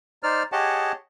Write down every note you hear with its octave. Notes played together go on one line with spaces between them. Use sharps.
D#4 C5 D5 F6
G4 G#4 C#5 D#5 F#5 A5